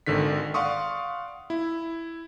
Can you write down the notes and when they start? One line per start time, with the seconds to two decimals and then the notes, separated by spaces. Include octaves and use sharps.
0.06 G#1 D3 D#3 B6
0.54 D5 F5 F#5 C6 C#6 D#6
1.50 E4